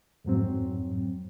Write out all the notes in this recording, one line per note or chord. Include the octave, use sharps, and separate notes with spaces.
F2 G#2 F#3 C4